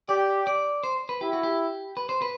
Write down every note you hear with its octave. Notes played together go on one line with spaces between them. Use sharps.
G4 D5
D5
C5
B4
E4 G4
F#4
G4
B4
C5
B4